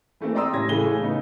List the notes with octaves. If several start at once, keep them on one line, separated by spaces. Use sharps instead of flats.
E3 A3 A#3 C4
D5 G5 A#5 C6 D#6 E6
A2 C3 C#4 G#6 A#6
A2 C#3 E3 G#4 A4 G7
A3
C#3 A3 B3 D#4